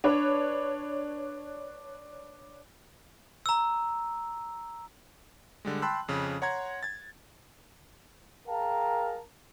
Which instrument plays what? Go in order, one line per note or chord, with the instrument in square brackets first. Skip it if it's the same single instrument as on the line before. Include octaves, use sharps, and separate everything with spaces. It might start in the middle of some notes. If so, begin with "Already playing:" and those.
[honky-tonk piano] D4 B4 C#5
[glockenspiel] A#5 E6
[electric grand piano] D3 G3 G#3
G5 A5 B5 C6 E6 F#6
F2 C#3
C#5 F#5 A#5 C6 G#6
G#6 A6
[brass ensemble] G#4 A#4 F5 G5 A5 A#5